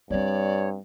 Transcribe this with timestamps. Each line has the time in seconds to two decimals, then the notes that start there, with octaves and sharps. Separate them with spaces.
0.10 G2 G3 C4 C#5 D5